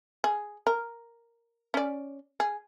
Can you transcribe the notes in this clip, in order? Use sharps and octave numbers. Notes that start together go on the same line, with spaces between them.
G#4
A#4
C#4 D5
G#4